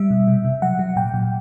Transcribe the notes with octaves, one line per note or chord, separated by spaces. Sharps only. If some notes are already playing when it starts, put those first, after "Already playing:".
Already playing: G3 E5
B2
C3
C3
F#3 F#5
F#3
A#2 G5
A#2